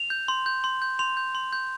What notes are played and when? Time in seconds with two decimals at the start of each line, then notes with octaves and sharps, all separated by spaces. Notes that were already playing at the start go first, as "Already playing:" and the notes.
Already playing: F7
0.10 G6
0.28 C6
0.46 G6
0.64 C6
0.82 G6
0.99 C6 F7
1.17 G6
1.35 C6
1.53 G6